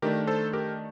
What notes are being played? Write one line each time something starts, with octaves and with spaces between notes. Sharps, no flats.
D#3 A3 D4 G4 A#4
A4 C5
G4 A#4